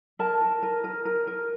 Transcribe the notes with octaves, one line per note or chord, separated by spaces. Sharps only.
A#4 A5
A#4
A#4
A#4
A#4
A#4